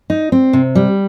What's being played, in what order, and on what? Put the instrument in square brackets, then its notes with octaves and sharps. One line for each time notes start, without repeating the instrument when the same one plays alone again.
[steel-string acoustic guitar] D#4
C4
C3
G3